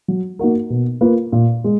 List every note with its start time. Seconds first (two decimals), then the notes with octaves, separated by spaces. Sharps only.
0.08 F#3
0.39 A#3 D#4 F#4 A#4
0.70 B2
1.01 A#3 F4 B4
1.32 A#2
1.64 G#3